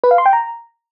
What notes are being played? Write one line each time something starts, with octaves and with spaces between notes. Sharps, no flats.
B4
F5
C6
G5
A#5